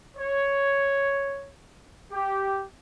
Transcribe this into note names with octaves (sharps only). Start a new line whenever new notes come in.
C#5
G4